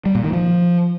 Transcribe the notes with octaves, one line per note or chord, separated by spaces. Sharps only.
G3
A#2
D#3
F3